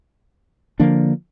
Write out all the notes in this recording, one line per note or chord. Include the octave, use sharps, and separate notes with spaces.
D3 F3 A#3 D4